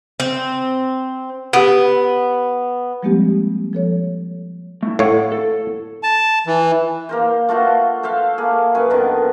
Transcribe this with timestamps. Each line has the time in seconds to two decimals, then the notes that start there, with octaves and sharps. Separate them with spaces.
0.20 C4
1.53 B3 G4 F#5
3.03 F3 G3 G#3 A#3 C4 G4
3.73 F3 A4 C#5
4.83 A3 E4
4.99 A2 C#5 F5 F#5
5.32 A4
6.03 A5
6.47 E3
7.09 A#3 A#4 C5
7.49 A3 F4 F#4 C5
8.03 A4 C5 E5 F5
8.38 A#3 G#4
8.75 F#2 B4 C#5 G#5
8.90 D3 D#3 B3